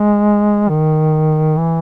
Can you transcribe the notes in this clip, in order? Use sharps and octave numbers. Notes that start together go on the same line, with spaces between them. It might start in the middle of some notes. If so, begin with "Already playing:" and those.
Already playing: G#3
D#3
E3